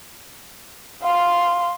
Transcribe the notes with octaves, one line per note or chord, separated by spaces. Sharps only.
F5 C6